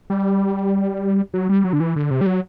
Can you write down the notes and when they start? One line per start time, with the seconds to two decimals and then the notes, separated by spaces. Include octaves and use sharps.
0.10 G3
1.34 F#3
1.49 G3
1.64 F#3
1.73 D3
1.80 E3
1.96 D3
2.11 C3
2.21 G3
2.26 F#3